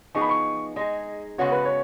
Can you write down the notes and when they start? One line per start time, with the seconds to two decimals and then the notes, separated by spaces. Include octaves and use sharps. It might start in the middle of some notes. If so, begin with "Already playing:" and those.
0.14 F3 B3 D#4 G#4 C#6
0.22 B5
0.29 C#6
0.76 G#3 D#4 G#4 D#5
1.38 C#3 G#3 B3 F#4 C#5
1.52 B4
1.65 C#5